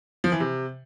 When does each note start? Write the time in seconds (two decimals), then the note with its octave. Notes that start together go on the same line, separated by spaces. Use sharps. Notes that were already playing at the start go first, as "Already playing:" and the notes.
0.24 F3
0.32 E3
0.40 C3